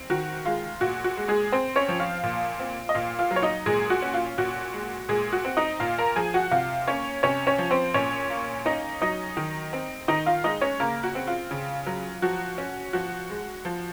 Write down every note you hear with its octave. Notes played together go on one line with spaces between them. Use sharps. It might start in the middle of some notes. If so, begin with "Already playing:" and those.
Already playing: C4
D#3 F#4
G#3 F4
A#2 F#4
F#4
G#3
G#3 G#4
C4 C5
C#4 C#5
F3
F4 F5
A#2
C4
D#5
A#2 F4 F5
F4 F5
F#3
C#5
D#4 D#5
A#2 G#3 G#4
F#4
C#4
F4
A#2 F#4
G#3
A#2 G#3 G#4
F#4
C4
D#4 D#5
A#2 F4 F5
A#4 A#5
F3 G#4 G#5
F#4 F#5
C3 F4 F5
A#3 C#4 C#5
C3 C#4 C#5
C#4 C#5
F3
C4 C5
A#2 C#4 C#5
A#3
C#4 D#4 D#5
F#3 D#4 D#5
D#3
C4
D#3 D#4 D#5
F4 F5
G#3 D#4 D#5
C#4 C#5
C#3 A#3 A#4
F#4
C4
F4
C#3
F#3
F3 F#4
C#4
F3 F#4
G#3
F3